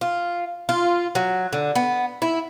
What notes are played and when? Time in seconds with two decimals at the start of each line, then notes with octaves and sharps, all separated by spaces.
0.01 F4
0.69 F4
1.15 F#3
1.53 D3
1.75 B3
2.22 E4